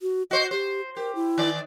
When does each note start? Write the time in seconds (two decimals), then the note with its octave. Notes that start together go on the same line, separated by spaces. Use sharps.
0.02 F#4
0.31 F#4 C5 D#5
0.51 G4 C5
0.97 G4 A#4
1.15 E4
1.38 D#3 D5